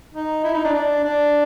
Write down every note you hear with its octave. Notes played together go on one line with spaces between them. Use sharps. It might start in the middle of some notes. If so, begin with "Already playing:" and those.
D#4
E4
D#4
D4
D4
D4